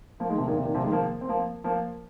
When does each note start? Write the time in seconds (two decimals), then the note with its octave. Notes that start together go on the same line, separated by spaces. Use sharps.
0.20 F3 A#3
0.29 D#3 G#3
0.38 C3 F3
0.47 A#2 D#3
0.56 C3
0.65 A#2 D#3
0.74 C3 F3
0.84 D#3 G#3
0.92 F3 A#3
1.21 C4
1.29 F3 A#3
1.64 F3 A#3